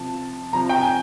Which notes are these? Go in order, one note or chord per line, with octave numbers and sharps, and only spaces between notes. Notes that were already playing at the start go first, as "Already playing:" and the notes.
Already playing: C3 F3 A5
C3 F3 A#5
G5
G#5